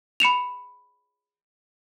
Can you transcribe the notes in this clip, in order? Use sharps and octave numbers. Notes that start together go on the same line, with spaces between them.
B5 C#7 E7 F7